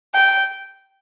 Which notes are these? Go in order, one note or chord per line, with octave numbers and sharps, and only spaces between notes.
G5